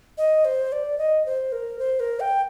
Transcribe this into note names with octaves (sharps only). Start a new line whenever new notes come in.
D#5
C5
D5
D#5
C5
A#4
C5
A#4
G5